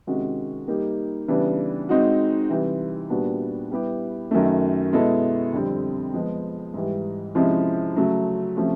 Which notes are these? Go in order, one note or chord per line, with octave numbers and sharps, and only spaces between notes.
C3 D#3 G#3 C#4 F#4
G3 A#3 D#4 G4
C#3 E3 G3 B3 D4
G#3 C4 D#4 F#4
C3 E3 G3
A#2 G3 B3 D4 F#4
G3 B3 E4 G4
F#2 D#3 F#3 A3
B2 G#3 B3 E4 A4
F2 D3 G3 C4
F3 G#3 B3
G#2 E3 G3
C3 F3 G#3 C#4 E4
C#3 F#3 A3 C#4
C3 F3 A3 C#4